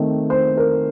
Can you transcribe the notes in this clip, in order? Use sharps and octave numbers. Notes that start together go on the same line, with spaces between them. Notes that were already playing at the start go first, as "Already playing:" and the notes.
Already playing: D#3 A3 C4
C5
A#4